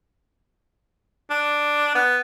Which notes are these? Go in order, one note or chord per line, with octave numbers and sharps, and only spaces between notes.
D4
B3